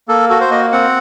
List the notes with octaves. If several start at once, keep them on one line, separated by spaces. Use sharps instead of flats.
A#3 A4
F#4 A4
C5
A#3 D#5
C4 F#5